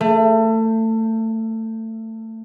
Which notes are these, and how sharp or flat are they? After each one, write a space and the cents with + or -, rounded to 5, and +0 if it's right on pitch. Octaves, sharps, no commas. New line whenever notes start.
A3 +25